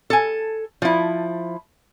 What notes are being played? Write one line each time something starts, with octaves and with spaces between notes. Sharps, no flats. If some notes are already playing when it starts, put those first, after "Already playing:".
A4 G#5
F3 E4